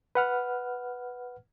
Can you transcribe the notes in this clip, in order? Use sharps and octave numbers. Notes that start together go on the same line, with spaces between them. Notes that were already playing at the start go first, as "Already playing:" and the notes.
B4 F#5 F6